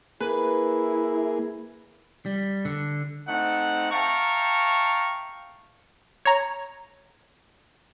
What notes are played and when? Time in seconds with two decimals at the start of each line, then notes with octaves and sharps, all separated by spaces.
0.21 A#3 E4 G#4 B4
2.26 G3
2.65 D3
3.28 A3 C4 D#4 F#5
3.91 E5 F5 G5 A5 A#5 C#6
6.25 C#5 A#5